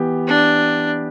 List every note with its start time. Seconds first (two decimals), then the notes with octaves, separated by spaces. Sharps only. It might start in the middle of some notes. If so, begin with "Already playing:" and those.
Already playing: E3 B3 G4
0.27 D4